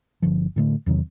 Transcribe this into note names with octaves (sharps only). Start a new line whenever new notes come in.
G1 D3 F3
A2 D3 A3
E2 C3 D#3 F#3